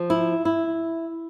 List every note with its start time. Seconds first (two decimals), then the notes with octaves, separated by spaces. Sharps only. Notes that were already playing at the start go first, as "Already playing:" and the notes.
Already playing: F3
0.10 E4
0.45 E4